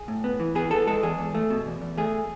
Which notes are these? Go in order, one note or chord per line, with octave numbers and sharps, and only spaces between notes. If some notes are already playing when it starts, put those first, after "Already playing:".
Already playing: G#4
A2
B3
E3
B3 G#4
B3 A4
G#3 A4
E2 G#4
E2
A3
B2
E2
E2
A3 G#4